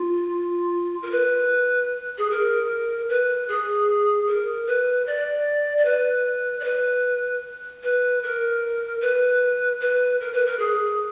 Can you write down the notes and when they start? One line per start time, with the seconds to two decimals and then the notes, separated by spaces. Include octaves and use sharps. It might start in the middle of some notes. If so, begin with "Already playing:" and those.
Already playing: F4
1.03 A#4
1.11 B4
2.18 G#4
2.31 A#4
3.09 B4
3.48 G#4
4.27 A#4
4.67 B4
5.07 D5
5.78 D5
5.85 B4
6.60 D5
6.64 B4
7.83 B4
8.23 A#4
9.01 B4
9.81 B4
10.20 A#4
10.33 B4
10.46 A#4
10.59 G#4